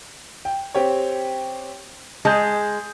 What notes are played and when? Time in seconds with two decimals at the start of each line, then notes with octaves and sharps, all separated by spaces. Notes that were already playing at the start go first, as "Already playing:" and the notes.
0.45 G5
0.75 C4 G4 C#5
2.25 G#3 A5 D#6 G6